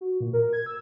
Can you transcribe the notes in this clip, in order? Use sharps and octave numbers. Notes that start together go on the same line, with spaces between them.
F#4
A#2
A#4
G#6
E6